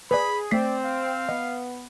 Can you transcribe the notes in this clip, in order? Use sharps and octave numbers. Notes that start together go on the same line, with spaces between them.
G#4 B4 D5 B5
A3 C4 D5 B6 C7
F5
B3 D#5